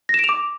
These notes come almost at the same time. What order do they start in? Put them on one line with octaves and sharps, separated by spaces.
A#6 E7 D7 F7 D6